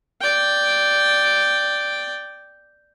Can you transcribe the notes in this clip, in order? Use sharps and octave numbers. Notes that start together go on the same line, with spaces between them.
D5 G5